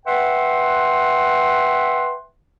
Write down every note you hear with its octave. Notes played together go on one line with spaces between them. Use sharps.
B4 E5 F#5 G5 C6